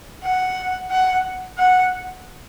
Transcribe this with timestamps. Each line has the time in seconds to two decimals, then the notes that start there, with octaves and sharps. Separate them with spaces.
0.24 F#5
0.91 F#5
1.58 F#5